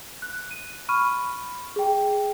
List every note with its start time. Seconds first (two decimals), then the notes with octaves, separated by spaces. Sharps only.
0.22 F#6
0.51 D#7
0.89 B5 C#6 F6 D#7
1.76 G#4 G5